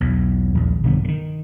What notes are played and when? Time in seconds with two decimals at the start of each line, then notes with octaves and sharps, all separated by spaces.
0.01 B1 E2
0.55 A#1 D#2
0.84 B1 G2 D3 B3
1.04 D3 D#3